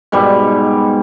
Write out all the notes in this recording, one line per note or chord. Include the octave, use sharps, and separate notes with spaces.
G#2 B2 G3 G#5